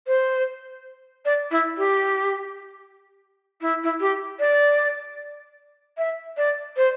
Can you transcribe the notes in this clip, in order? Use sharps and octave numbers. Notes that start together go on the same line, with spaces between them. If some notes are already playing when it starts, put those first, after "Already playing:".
C5
D5
E4
G4
E4
E4
G4
D5
E5
D5
C5